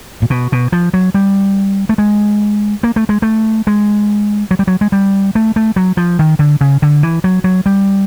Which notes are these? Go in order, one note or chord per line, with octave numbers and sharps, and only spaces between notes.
A#2
B2
B2
F3
F#3
G3
A3
G#3
A#3
A3
G#3
A3
G#3
F#3
G3
F#3
G#3
G3
A3
A3
F#3
F3
D#3
D3
C#3
D3
E3
F#3
F#3
G3